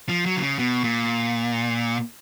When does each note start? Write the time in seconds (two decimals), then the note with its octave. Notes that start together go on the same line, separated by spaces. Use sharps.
0.09 F3
0.26 F#3
0.36 D3
0.42 C#3
0.59 B2
0.84 A#2